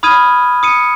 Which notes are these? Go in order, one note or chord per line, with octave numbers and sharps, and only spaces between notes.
B5 D#6 F6 G#6 D#7
D#6 C#7 D#7